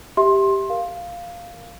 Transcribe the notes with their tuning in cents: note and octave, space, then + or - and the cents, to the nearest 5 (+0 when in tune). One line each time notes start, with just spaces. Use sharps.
G4 +0 E5 -15 C6 +20
A#4 +0 F5 +0